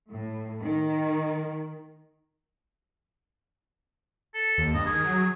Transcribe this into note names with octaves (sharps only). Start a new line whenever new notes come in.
A2
D#3
A4
D#2
G2 D#5
D#3 G#4
F#3